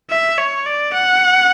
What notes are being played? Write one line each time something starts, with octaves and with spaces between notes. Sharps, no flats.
E5
C#5
D5
F#5